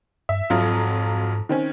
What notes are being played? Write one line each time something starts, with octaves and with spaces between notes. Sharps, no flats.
G2 E5
F2 G#2 F#3 F4
D#3 C4 C#4